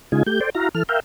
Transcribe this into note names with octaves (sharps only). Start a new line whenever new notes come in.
C#3 G#3 D#4 F4 G#5
A3 G4 G6
A4 C5 D5 G5
E4 F#4 F5 A#5
E3 A4 F6
A#4 E5 F5 G5